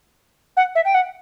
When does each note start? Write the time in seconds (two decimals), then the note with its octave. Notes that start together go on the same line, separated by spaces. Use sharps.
0.57 F#5
0.75 E5
0.85 G5
0.94 F#5